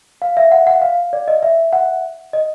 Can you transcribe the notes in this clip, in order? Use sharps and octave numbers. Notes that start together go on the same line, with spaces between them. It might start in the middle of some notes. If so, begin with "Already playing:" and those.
F5
E5
F#5
F#5
F5
D5
D#5
E5
F#5
D#5